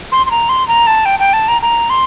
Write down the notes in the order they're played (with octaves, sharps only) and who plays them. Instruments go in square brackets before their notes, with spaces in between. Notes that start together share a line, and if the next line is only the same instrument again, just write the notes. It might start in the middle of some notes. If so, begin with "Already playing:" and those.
[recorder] C6
C6
A#5
C6
A#5
A5
G5
G5
A5
A#5
A#5
C6